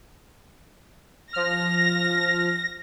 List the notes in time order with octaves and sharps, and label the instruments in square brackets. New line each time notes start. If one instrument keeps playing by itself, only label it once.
[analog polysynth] F3 F6 [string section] A#6